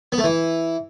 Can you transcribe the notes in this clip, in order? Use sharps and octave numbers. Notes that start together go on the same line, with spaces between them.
B3
A3
E3